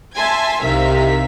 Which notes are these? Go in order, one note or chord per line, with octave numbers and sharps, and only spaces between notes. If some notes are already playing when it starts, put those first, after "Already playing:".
E5 G#5 A5 C6 G#6
C2 C3 D#3 E5 F5 B6